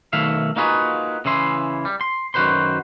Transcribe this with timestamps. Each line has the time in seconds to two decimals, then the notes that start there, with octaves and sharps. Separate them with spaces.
0.13 B1 D#3 A3 E5 F5
0.56 A#3 D#4 F4 F#4 G#4 B4
1.25 C#3 E3 E4 C6
1.85 G3
2.01 C6
2.34 F#2 D#3 F#4 B4 C5 C6